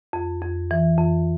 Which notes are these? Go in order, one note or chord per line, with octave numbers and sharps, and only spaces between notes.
F2
F2
E3
F2